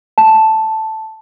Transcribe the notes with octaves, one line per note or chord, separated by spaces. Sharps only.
A5